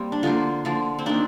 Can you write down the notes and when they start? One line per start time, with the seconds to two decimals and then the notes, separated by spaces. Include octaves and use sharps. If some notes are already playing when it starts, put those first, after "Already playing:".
Already playing: G3 A#3 C4
0.12 D4
0.23 D3 F3 A#3 F4
0.65 D3 F3 A#3
0.99 C4
1.06 D#3 A#3 D4